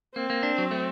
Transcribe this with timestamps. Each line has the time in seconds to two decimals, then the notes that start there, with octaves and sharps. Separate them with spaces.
0.15 A#3 C4
0.30 A#3
0.43 D4
0.58 F#3
0.71 A3